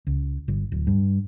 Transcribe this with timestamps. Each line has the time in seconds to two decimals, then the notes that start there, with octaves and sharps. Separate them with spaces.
0.07 C#2
0.48 G1
0.72 D1
0.87 G2